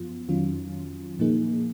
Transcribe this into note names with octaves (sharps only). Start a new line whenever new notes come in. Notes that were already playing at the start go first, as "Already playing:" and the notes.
Already playing: F#2 F3 B3 F4
F2 D#3 F#3 C#4 F4
A#2 F3 A#3 D#4 G#4